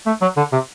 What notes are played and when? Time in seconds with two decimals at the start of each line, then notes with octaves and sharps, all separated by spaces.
0.06 A3
0.21 F#3
0.37 D3
0.52 C3